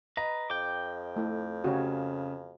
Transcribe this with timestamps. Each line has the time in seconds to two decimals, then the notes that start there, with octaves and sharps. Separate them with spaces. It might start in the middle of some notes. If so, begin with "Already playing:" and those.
0.17 B4 D#5 A#5
0.50 F2 G5 D6
1.16 A3 E4 A4
1.64 C#3 F#4 G4 C#5